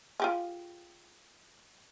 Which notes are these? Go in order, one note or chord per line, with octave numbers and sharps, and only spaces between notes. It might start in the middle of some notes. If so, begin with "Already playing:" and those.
F4 G4 G#4